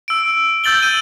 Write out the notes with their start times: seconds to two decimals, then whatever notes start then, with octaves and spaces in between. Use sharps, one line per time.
0.08 E6 D7
0.64 E6 G6 A6 F#7 G7
0.82 D#7